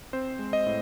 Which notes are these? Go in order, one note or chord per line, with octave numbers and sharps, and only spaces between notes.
C4 C5
G#3
D#5
A2